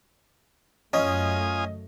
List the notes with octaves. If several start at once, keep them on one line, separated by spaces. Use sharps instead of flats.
F#2 A3 C#4 F4 D#5 G#5 D#6